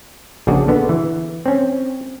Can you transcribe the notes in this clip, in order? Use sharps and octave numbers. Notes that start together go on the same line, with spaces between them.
A#1 C#3 D4 F#4 G#4 D5
D3 B3
E3
C4 C#4